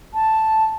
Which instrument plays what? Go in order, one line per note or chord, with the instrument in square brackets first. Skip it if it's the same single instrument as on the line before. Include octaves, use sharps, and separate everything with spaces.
[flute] A5